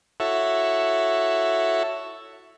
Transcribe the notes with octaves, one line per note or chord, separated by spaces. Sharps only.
E4 F#4 A4 C#5 E5